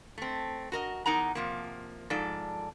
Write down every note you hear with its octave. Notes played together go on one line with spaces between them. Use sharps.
A3 C4
F#4 A#4 D#5
E2 D#4 A#4 F#5 A#5
C3 F3 A#3
G#2 F3 A4 D5